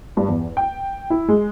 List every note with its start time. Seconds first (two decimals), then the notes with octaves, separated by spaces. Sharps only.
0.17 G2
0.29 E2
0.57 G5
1.10 E4
1.29 G#3